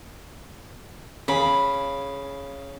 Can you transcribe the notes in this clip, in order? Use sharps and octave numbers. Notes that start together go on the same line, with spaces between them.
C#3 B5